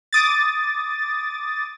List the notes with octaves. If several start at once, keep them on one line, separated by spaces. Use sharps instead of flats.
D6 D#6 A6